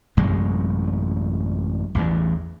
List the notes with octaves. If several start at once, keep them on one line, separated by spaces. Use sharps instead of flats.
A1 F#2 C3 G#3
A1 E2 G2 E3